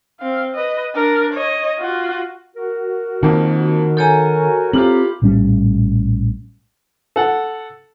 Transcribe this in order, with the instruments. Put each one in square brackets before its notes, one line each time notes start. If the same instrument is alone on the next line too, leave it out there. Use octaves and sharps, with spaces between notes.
[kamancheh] C4 F5
B4 D#5
D4 A#4
C#5 D#5
F4 F#4
[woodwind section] F#4 A#4
[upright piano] F2 A#3 [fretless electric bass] D#3
[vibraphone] A4 C#5 A#5 [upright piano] G#5 G6
[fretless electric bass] C4 [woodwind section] E4 G4 [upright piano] F4 F6 F#7
[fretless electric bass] A#1 A2 G3 C#4
[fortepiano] A4 F#5